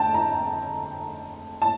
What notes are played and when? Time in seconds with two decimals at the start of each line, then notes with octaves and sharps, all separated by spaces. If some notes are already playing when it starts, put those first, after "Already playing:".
Already playing: F2 D3 A3 G5 A5
0.14 A#5
1.62 A5